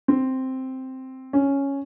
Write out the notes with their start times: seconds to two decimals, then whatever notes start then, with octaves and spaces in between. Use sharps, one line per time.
0.08 C4
1.33 C#4